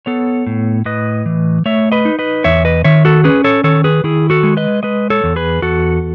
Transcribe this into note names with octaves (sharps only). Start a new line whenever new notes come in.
B3 A4 C#5
A2
A2 B4 D#5
E3
A3 C#5 E5
B4 D#5
D#4
B4 D#5
E2 C#5 E5
B4 D#5
D#3 C#5 E5
F#4 A4
C#4 G#4 B4
A4 C#5
D#3 A4 C#5
G#4 B4
D#3 E4 G#4
F#4 A4
G#3
B4 D#5
G#3 B4 D#5
A4 C#5
E2
G#4 B4
E2 F#4 A4